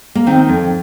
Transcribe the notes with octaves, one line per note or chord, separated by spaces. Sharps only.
A#3
D#3 C4
F2